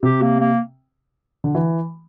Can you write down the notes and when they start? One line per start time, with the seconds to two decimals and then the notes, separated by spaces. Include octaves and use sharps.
0.03 C3 G4
0.22 A#3
0.40 A#3
1.44 D3
1.55 E3